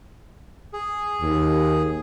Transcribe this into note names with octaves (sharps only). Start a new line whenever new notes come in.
G#4
D#2